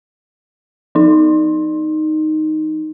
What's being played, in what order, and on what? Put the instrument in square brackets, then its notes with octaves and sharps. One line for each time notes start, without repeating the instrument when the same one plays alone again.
[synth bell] F3 D#4